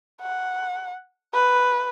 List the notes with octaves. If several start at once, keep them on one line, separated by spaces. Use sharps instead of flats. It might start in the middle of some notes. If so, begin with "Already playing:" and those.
F#5
B4